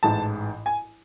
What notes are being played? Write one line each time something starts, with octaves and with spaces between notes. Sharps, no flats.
A1 G#2 E3 A5
G#5